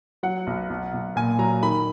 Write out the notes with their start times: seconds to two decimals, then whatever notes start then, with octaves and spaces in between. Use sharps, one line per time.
0.23 F#3 F#5
0.47 B1
0.70 B1
0.94 B1
1.16 A#2 G#5
1.39 F#3 A#5
1.63 D#3 B5